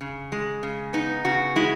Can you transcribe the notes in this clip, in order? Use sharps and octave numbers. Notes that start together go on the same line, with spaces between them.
C#3
G#3
C#3
B3 D#4
C#3 F#4
G#3 E4